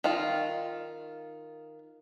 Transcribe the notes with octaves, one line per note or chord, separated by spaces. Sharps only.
D#3 F4